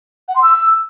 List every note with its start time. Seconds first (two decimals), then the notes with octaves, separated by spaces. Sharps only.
0.28 F#5
0.35 C6
0.42 E6